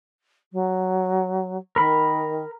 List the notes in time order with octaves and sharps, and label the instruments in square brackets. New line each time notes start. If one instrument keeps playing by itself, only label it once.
[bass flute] F#3
[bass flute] D#3 [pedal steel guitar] A#4 B5